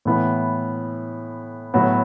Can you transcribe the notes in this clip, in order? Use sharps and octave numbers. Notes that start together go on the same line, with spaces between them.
A2 E3 B3 E4
A2 F#3 B3